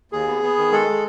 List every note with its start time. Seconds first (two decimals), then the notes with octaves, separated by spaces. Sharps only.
0.12 D#2 G#4
0.27 B3
0.42 B3
0.58 D#3
0.72 G#3 A4
0.87 G#3